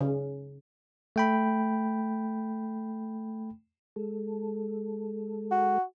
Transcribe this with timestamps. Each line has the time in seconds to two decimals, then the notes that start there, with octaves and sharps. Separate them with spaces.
0.01 C#3
1.16 A3 G5 B5
3.96 G#3 A4
5.51 F#4